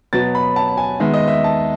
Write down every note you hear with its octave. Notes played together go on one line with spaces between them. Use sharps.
B2 F#3 B3 A6
B5
A5
G#5
D#3 G#3 B3 E5
D#5
E5
A5